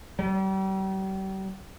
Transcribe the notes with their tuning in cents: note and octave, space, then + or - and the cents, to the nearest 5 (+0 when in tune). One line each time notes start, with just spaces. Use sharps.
G3 -40